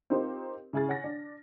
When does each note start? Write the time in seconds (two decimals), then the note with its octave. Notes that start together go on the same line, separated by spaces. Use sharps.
0.10 C4 D#4 F4 G4 A#4 C5
0.73 C#3 E4 G#4 F6 A6
0.89 C#5 F#5 G#5 A#6
1.04 D4